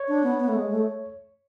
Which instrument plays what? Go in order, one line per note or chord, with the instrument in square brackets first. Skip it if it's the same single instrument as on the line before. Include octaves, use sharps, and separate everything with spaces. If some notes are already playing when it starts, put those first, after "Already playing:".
Already playing: [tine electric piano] C#5
[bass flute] D4
B3
B3
A3
G#3
A3